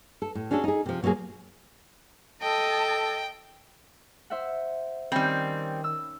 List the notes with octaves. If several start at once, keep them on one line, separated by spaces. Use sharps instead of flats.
A4
A2
C#4 D4 F#4 G#4 A4
D#4 G#4
C3 F3
B2 F#3 A3 A#3 G#4
A4 D#5 G5 A5
C5 E5 F#5
D#3 G3 C4 C#4 B5
E6